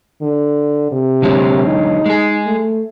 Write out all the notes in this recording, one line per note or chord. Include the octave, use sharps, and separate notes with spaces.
D3
C3
D3 F#3 G#3
D#4
G#3 G#4
A3